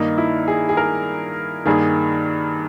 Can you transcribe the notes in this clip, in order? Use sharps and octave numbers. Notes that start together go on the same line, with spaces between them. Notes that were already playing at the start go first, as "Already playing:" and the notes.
Already playing: G2 D#3 A#3 D#4
E4
G#4
G#4
A#4
G2 D#3 A#3 G#4